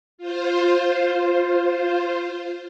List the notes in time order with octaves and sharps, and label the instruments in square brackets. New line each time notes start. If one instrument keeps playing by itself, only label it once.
[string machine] F4 C5